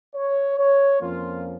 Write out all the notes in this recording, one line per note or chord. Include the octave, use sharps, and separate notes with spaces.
C#5
C#5
F2 F3 A#3 C#4 F4